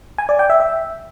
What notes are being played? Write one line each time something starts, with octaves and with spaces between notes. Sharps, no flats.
G#5
D5
G5
E5
E5